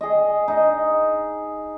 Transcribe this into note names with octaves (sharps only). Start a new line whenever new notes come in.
G#4 D#5
D#4 D#5